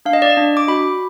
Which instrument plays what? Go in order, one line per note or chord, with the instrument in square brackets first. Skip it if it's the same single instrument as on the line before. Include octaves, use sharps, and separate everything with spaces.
[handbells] D4 F5
D#5
D5
D#5
D4
D6
F#4 B5